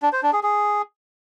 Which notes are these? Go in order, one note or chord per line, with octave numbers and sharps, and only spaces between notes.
D4
C5
D4
G#4
G#4